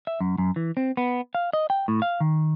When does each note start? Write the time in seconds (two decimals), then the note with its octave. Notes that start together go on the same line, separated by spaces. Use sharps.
0.07 E5
0.21 F#2
0.38 F#2
0.56 E3
0.77 C4
0.97 B3
1.35 F5
1.53 D#5
1.70 G5
1.88 A2
2.02 F5
2.20 D#3